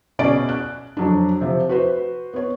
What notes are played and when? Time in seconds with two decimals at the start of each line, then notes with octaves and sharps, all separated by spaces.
0.19 B2 C#4 G#4 D5 D7
0.49 F#6
0.97 F2 F#3 D4
1.41 C3 F3
1.69 F#4 B4 C5
2.34 B3 C#5